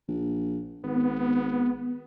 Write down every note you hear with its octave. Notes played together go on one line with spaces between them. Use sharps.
A#1
G#1 B3